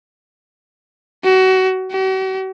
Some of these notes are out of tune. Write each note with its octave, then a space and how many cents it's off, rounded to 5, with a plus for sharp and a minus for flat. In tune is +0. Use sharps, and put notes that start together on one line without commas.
F#4 +25
F#4 +45